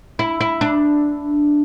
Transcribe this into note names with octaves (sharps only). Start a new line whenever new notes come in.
E4
E4
D4